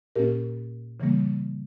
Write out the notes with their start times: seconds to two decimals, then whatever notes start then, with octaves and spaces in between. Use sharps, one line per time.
0.16 A#2 A#3 C#4 G4 A#4
1.00 C#3 E3 G3 A#3